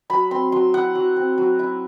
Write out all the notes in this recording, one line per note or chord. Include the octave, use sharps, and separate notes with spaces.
F#3 B5
C4 C6
F#3 C6
E4 F#5
F#3
C4
F#3
E4